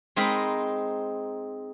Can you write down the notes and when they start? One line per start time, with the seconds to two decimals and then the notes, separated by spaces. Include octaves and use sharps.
0.16 G#3 C4 D#4 A#4 B5